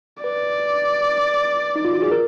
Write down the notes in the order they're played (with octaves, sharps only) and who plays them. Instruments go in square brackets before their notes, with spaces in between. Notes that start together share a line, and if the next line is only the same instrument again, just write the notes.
[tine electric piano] B4 [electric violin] D5
[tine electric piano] D#4
F4
F#4
G#4
A#4